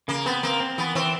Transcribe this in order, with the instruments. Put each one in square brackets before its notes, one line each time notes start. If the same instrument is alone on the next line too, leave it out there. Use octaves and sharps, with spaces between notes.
[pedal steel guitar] C#3 [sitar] A#3
[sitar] B3 [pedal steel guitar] C4
[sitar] A#3 [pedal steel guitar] C4
[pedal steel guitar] C4
[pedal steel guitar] E3 [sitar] B3
[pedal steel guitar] E3 [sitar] C4